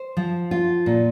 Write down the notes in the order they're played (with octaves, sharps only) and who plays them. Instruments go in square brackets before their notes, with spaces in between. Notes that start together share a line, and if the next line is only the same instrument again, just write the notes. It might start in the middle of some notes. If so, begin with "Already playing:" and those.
Already playing: [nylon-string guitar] C5
F3
F4
A#2